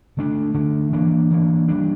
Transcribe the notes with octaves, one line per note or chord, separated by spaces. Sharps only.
D3 A3 D4
D3 A3 D4
E3 A#3 D4
E3 A#3 D4
E3 G3 D4